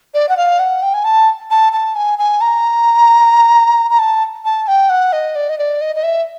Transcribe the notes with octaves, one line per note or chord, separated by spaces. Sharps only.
D5
F#5
F5
F#5
G5
G#5
A5
A5
A5
G#5
G#5
A#5
A#5
A5
A5
G5
F#5
D#5
D5
D#5
D5
D#5
D#5
E5